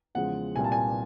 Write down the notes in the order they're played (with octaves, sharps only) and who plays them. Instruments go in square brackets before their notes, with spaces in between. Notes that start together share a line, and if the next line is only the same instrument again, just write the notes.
[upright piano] E2 C#3 F3 G#3 F#5
C2 A#2 G3 G#5
A5
G#5